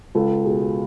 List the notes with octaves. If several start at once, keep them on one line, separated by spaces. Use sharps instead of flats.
C#2 A4
B2 G#4